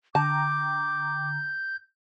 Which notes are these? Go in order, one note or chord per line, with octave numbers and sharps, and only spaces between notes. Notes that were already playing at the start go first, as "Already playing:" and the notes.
D3 G5 A5 A#5 D6 G6